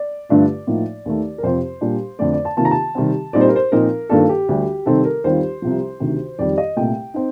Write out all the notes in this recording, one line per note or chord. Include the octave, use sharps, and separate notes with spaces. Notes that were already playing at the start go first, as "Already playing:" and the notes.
Already playing: D5
G2 D3 A3 D4 F4
A2 F3 A#3 D#4
D#2 D#3 A3
A#4
F2 C3 F3 C4 C5
A#2 G3 D4
F2 D3 A3 D5
D5
A5
C3 D#3 A#3 F4 A5
A#5
A5
C3 D#3 G3 C4
A#2 G3 C4 D#4 D5
C5
A#4
C5
A#2 F3 C4 D#4 A#4
G2 D#3 A#3 D4 F4 A4
G4
D2 D3 G3
C3 D#3 G3 C4 D#4 A4
A#4
D#2 D#3 G3 C4 F4 C5
C2 C3 F3
D2 C3 D#3
F2 D#3 G3 D5
D#5
C2 A#2 A3 G5
C4 D#4